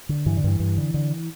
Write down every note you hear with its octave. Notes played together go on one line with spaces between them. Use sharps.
D3
G2 E3
D3
G2 E3
G2
D3
D3